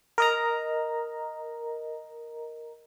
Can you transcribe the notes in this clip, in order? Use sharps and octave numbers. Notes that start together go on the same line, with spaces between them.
A#4 D#5 A#5